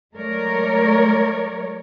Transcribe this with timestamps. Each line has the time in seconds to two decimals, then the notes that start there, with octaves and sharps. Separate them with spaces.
0.14 F#3 G#3 A3 A#4 C#5 D5